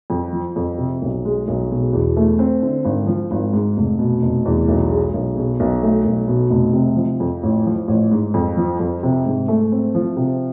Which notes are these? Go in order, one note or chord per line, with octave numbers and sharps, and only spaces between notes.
F2
F3
F2
C3
B1
G#3
B1
B2
E2
A3
C4
D3
G#1
F3
G#1
G#2
F1
B2
F1
E2
B1
G#3
B1
B2
B1
A3
B1
B2
F1
C3
F3
F2
A1
F3
A1
G#2
F2
F3
F2
C3
G#2
A3
C4
F3
C3